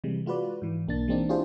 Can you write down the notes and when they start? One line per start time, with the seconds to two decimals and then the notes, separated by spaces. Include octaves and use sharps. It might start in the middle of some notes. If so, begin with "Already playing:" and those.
0.04 C3 E3 G3 G#3
0.26 G#3 F4 F#4 B4 D5
0.62 G#2 E3
0.88 B1 A#3 D4 A6
1.08 E3 G#3 A#3 C4 D4 D#4
1.29 D4 E4 F4 G4 G#4 C5